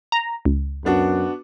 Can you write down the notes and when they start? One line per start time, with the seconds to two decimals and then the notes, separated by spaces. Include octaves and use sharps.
0.12 A#5
0.45 C#2
0.85 F#2 B3 D4 F#4